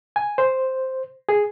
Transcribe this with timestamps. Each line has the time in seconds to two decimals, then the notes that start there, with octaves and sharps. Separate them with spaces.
0.16 G#5
0.38 C5
1.29 G#4